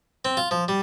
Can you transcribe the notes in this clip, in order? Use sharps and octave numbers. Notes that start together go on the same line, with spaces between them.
C4
F4
F3
G3